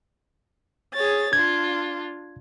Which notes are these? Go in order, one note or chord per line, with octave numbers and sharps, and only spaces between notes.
G#4 C#5 A6
D4 F4 G#6